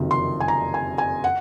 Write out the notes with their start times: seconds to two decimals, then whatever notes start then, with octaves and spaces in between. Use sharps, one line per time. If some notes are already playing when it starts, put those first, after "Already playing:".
Already playing: F#1 F2 C3 D#3 F#3
0.11 C6
0.40 G#5
0.48 A#5
0.74 G#5
0.98 G#5
1.24 F#5